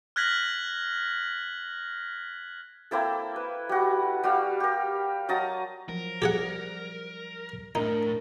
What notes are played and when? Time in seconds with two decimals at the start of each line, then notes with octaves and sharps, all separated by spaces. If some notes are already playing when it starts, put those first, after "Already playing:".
0.16 F6 F#6 G#6 A#6 B6 F#7
2.91 A#3 C4 E4 A4
3.36 B4
3.69 G3 F#4
4.24 G3 F#4 F5
4.60 G4 A#4
5.29 F#3 D#5 A5 A#5
5.89 F3 F#3 A#4
6.22 F3 G3 G4 G#4 F#5
7.75 A2 D4 D#4 A#4